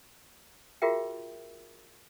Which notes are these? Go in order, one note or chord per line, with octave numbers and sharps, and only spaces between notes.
F4 F#4 G#4 A#4 E5 G5